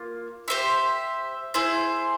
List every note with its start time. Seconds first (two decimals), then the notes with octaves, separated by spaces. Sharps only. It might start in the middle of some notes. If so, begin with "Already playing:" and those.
Already playing: A#3 F4
0.48 G4 C5 E5
1.54 E4 G#4 C5